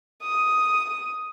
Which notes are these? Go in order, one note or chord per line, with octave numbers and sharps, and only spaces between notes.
D#6